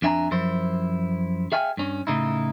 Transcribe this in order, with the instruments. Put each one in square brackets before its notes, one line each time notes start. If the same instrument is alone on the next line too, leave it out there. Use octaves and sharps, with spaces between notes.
[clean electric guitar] F2 D4 E5 G#5 A#5
F#2 F3 E4 C5
G#4 E5 F5 G5 G#5
G2 C#4
A2 C#3 D#4 E4